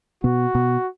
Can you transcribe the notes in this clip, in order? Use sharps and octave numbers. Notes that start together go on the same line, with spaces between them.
B2 B3 F#4
B2 B3